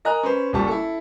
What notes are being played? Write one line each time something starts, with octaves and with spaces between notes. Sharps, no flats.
A#4 D#5 G#5 A#5 F#6
C#4 B4 C5
F#1 A#2 G3 F4 A5 C#6
E4 A4